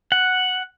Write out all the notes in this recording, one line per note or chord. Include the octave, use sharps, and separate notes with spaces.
F#5